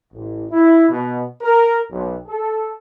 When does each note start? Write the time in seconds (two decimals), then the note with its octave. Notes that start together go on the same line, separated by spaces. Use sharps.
0.14 A1
0.51 E4
0.89 B2
1.41 A#4
1.90 B1
2.27 A4